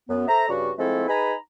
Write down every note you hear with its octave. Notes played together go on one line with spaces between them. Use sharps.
F#2 B3
A4 C5 E5 A#5
G2 C#3 G3 F#4
F3 G#3 A3 C4 E4 A4
D#4 G#4 B4 G#5 A#5 B5